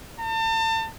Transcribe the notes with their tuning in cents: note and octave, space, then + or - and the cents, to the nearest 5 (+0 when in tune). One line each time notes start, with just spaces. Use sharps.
A5 +35